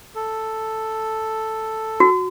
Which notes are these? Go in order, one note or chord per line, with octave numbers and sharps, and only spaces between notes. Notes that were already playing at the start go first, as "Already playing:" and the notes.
A4
F#4